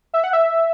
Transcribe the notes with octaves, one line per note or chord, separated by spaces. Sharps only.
E5
F#5
E5